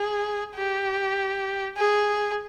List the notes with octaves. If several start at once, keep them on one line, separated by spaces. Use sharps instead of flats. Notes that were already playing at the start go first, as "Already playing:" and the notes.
Already playing: G#4
G4
G#4